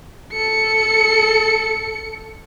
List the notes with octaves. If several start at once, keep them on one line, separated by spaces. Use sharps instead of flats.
A4 C#7